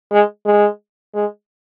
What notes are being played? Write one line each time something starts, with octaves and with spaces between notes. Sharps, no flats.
G#3
G#3
G#3